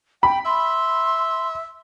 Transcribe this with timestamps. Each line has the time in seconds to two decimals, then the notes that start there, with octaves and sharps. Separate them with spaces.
0.23 G5 B5
0.45 E5 C6